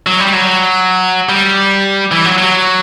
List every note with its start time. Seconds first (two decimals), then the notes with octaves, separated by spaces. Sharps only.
0.06 F#3
0.20 G3
0.33 F#3
1.29 G3
2.12 E3
2.25 F#3
2.38 F#3